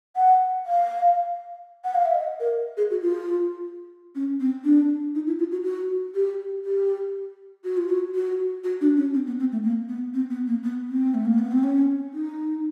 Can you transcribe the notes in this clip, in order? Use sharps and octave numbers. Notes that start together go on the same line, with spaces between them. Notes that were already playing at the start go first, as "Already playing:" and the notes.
F#5
F5
F#5
F5
E5
D#5
A#4
G#4
F#4
F4
C#4
C4
D4
D#4
E4
F4
F#4
F#4
G4
G4
F#4
F4
F#4
F#4
F#4
D4
C#4
C4
B3
C4
A3
A#3
B3
C4
B3
A#3
B3
C4
A3
A#3
B3
C4
C#4
D#4